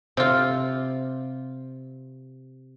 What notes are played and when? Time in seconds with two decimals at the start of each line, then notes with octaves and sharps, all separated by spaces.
0.17 C3 F4